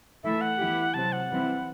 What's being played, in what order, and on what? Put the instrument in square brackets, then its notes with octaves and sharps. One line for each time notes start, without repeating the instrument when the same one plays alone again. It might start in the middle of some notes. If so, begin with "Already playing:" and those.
[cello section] E3 A3 E4 A4 [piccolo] E5
[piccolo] F#5
[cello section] E3 B3 E4 G4
[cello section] C3 F#3 C4 [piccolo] A5
[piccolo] F#5
[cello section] E3 G3 C4 E4